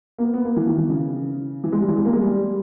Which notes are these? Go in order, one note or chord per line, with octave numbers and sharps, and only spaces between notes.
A#3
B3
B3
A#3
E3
D#3
E3
C#3
E3
G#3
G3
E3
G#3
A#3
G#3
G3